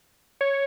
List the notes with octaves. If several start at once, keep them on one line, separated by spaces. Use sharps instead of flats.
C#5